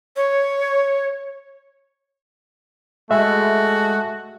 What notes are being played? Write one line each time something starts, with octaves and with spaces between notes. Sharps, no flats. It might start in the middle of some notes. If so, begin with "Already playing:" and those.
C#5
G#3 A3 F#4 E5